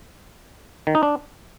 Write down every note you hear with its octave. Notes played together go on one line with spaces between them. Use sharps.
D#3
D#4
D4